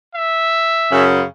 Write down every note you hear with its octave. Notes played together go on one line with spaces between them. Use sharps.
E5
F#2 C#3